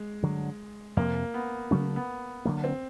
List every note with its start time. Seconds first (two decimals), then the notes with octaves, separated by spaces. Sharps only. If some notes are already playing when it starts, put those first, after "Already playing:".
Already playing: G#3
0.23 G2 D3 F#3
0.97 F2 C3 F3 A#3
1.34 B3
1.71 C#3 F#3 A3 C#4
1.96 B3
2.45 D3 F#3 A#3
2.64 C4